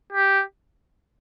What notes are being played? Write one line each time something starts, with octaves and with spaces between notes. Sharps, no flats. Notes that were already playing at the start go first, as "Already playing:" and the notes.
G4